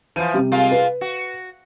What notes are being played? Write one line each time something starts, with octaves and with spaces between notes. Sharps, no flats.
E3 F3 D#7
C3 G3
G#3 A#3 F4
B4
F#4